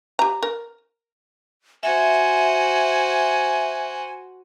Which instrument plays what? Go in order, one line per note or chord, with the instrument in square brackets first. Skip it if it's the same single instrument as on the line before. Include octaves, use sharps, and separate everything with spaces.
[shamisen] G4 A#5
A#4
[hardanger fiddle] F#4 C5 [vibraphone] E5 [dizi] G#5